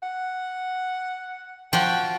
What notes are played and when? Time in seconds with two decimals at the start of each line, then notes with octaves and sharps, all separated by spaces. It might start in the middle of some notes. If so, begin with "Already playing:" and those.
0.03 F#5
1.73 F3 F#4 G5